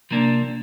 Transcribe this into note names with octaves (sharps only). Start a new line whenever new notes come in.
C3 F3 A#3 D4